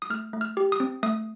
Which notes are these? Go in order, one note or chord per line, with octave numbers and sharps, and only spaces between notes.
D#6
A3 F6
A3
F6
G4
D#6
C4
A3 D#6